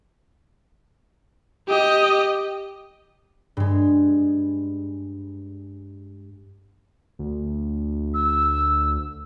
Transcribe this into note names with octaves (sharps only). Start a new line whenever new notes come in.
G4 D#5
G2 G#3
D2
E6